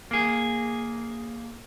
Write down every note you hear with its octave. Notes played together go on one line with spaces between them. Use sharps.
A#3 G#4